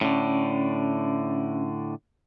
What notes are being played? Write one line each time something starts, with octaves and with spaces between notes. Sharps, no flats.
A2 D3 C#4